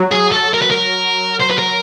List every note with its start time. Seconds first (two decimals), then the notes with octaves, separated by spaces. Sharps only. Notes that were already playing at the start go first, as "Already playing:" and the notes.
Already playing: F#3
0.11 G#4
0.32 A4
0.54 A#4
0.62 B4
0.71 A#4
1.42 C5
1.51 B4
1.59 A#4